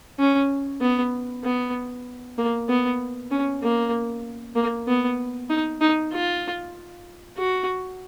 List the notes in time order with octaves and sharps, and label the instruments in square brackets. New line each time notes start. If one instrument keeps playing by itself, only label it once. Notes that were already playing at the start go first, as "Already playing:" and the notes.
[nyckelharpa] C#4
B3
B3
A#3
B3
C#4
A#3
A#3
B3
D#4
D#4
F4
F#4